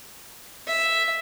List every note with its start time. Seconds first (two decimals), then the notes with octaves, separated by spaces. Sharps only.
0.67 E5